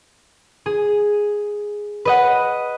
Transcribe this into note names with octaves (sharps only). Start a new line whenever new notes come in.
G#4
B4 D#5 F#5